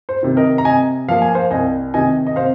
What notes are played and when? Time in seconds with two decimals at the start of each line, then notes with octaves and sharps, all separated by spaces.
0.09 C5
0.23 C3 D#3
0.37 A#4 D#5
0.58 A#5
0.65 C3 D#5 G#5
1.08 F3 A#3 F5
1.22 G#5
1.35 C5 F5
1.51 C2 D#5 G#5
1.94 C3 D#3 D#5 G#5
2.27 D#5
2.36 C3 C5 F5